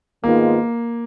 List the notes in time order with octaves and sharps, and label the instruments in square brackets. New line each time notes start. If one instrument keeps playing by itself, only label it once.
[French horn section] G#2 D#3 G#3 B3 F4 [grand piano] A#3